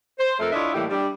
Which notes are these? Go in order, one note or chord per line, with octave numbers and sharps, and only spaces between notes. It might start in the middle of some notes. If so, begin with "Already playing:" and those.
C5
F2 A3 A4 A#4
D4 E4 F4 C#5 D#5 E5
A2 E3 G3 A3 A#3 G4
G3 D4